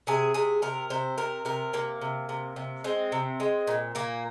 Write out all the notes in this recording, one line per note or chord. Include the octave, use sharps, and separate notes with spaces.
C3 G#4
C3 G#4
C3 A#4
C3 C5
C3 A#4
C3 A#4
C3 A#3
C3
C3
C3
G#3 C4
C3
G#3
A#2
A#2 A#3